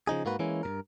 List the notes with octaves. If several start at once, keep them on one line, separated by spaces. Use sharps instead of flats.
C#3 F3 D#4 G#4
G#2 A#3 F#4 B4
E3 G#3 A#3 C#4 E4
G2 A#2 A#4